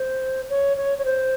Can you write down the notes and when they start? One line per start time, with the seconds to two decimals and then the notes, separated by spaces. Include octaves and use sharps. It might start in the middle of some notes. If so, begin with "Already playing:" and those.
Already playing: C5
0.49 C#5
0.77 C#5
0.99 C#5
1.05 C5